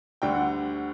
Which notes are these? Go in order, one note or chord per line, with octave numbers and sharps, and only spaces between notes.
D2 D3 G3 D4 G5
F#5